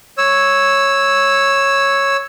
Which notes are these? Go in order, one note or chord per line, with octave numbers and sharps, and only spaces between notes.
C#5 E6